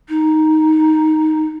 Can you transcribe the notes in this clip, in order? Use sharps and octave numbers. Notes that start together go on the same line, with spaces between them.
D#4